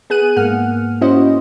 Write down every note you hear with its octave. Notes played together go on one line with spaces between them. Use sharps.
B3 G#4 F#6 D#7
G#2 A#3 F#5 F6
C#4 E4 F#4 C5 D#5